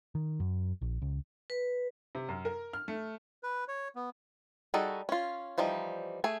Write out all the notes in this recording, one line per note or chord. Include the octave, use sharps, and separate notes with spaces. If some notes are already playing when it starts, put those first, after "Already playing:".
D#3
F#2
A#1
C#2
B4
C3
F#2
A#4
F6
A3
B4
C#5
B3
G3 D#4 F#4 G#4 A4
C#4 F4
E3 F3 G3 D#4
A3 G#4 G#5